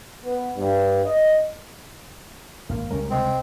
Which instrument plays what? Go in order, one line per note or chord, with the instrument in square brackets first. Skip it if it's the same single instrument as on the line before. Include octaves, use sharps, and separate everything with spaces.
[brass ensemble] B3
G2
D#5
[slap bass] G#1 [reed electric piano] A#3 F5
[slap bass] C#2 G3 G#3 [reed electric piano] C#4 A#4
[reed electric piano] C2 D#5 C6 [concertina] C4